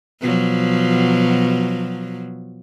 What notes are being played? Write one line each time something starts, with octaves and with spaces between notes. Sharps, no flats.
B2 F3 F#3